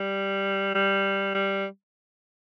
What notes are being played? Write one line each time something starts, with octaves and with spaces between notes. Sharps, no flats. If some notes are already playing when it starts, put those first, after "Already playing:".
Already playing: G3
G3
G3